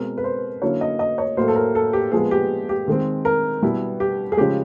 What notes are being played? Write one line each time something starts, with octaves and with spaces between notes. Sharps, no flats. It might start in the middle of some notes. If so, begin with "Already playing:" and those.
Already playing: B2 G#3 C4 A#4
B4
C5
D3 F#3 A#3 C#4 E4 C#5
D#5
D#5
C#5
A2 F#3 A#3 C5
A4
A#4
A4
G4
A#2 F3 G#3 B3 G#4
G4
G4
D#3 G#3 C4
A#4
B2 G3 B3 E4
G4
G#4
C#3 F3 G#3 G4